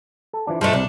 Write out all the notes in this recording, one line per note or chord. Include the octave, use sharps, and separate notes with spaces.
A4
E3 F3 D4
G2 F3 G#3 A3
C2 C3 D4